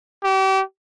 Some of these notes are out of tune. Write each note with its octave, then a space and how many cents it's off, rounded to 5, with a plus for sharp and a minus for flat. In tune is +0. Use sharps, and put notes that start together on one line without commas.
G4 -35